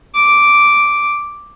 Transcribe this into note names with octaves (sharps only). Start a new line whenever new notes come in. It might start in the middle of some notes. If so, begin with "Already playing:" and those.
D6